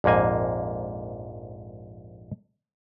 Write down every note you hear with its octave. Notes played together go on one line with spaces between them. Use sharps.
A#1 F2 G#2 A#3 G#5